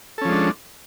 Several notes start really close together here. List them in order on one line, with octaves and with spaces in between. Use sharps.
A4 C#4 F3 G#3 D4